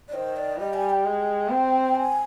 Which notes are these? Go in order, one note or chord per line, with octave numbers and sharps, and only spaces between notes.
D5
D#3 C5
D5
G3 D#5
G#5
G5
G#3
C4
G#5